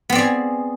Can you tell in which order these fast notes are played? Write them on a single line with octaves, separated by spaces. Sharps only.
B3 C4 D5 G#4